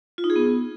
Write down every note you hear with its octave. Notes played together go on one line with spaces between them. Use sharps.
F4
D#4
G#4
B3